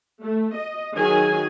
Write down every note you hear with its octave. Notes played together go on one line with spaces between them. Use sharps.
A3
D#5
D#3 F#3 G#4 G#5